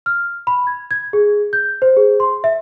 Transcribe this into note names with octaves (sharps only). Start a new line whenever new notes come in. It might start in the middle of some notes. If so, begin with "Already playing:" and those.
F6
B5
G#6
G#6
G#4
G6
C5
G#4
C6
E5